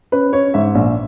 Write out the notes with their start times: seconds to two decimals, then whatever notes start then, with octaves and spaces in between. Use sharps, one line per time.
0.12 C#4 B4
0.33 C#4 C#5
0.54 G#2 E5
0.75 A#1